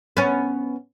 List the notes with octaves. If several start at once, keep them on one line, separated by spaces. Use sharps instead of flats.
B3 C#4